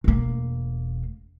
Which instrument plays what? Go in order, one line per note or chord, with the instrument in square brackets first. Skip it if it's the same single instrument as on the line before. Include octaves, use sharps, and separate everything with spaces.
[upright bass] E1 A#3